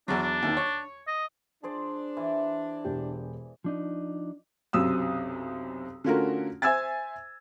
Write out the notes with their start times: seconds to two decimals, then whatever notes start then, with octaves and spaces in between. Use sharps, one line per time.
0.08 E2 F#3 D4
0.22 D4
0.42 D#2 D#3
0.57 C#5
1.07 D#5
1.63 D4 G#4 C5 D5
2.17 E3
2.85 E1 G4
3.64 F3 D4 D#4
4.73 B1 F#2 C3 D#6 E6
6.04 D3 A3 C#4 F4 F#4 A#4
6.62 C5 E5 G#5 E6 G#6 A6